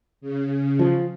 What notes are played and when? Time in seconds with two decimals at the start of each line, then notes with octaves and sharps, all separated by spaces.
0.21 C#3
0.79 F3